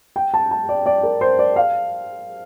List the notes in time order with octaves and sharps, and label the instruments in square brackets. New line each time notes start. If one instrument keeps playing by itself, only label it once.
[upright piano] G5
A5
A5
D5
D5
A#4
C5
D5
F5